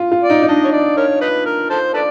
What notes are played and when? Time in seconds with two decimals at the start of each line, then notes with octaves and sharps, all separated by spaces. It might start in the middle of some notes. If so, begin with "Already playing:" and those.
Already playing: F4
0.12 F4
0.24 D5
0.30 D#4
0.42 D#4
0.48 D4 D#5
0.65 C#5
0.72 D5
0.97 A#4 C#5
1.21 D#4 B4
1.46 A#4
1.70 A4 C5
1.94 A4 B4 D5